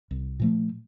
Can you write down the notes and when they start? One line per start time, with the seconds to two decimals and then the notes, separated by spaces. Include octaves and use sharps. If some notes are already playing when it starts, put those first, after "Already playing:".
0.11 C2
0.40 A#2 F3 A3